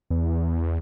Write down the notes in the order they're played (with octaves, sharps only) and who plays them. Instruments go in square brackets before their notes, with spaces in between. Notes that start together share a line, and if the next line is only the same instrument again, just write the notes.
[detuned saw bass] E2